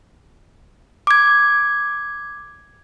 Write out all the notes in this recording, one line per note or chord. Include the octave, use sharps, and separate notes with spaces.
D6 G#6